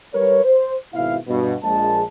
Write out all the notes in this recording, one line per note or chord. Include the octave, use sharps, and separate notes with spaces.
G3 A#4 B4 C#5
C5
G#1 B2 E4 F5
G2 B2
A#1 G#3 A5